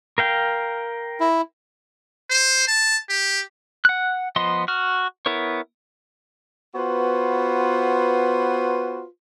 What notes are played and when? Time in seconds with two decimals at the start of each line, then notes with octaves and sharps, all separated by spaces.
0.18 A#4 F5 G5
1.20 E4
2.30 C5
2.67 A5
3.09 G4
3.85 F#5 F#6
4.36 F3 B3 D#5 C6
4.68 F#4 F6
5.26 B3 E4 A#4 C#5
6.75 B3 F4 F#4 B4 C5